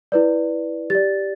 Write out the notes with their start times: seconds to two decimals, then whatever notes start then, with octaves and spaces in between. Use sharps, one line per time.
0.12 E4 B4 D5
0.90 G4 D5 A6